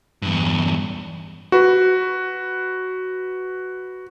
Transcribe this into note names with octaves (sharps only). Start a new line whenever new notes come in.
E2 G2
F#4 B4